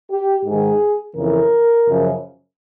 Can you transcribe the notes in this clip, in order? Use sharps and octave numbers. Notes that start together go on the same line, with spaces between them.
G4
G#2 D#3 G#4
F2 C#3 E3 A#4
F#2 C#3 F3